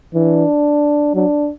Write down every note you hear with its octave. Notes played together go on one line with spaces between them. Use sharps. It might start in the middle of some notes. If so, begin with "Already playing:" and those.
E3 D4
F#3 D4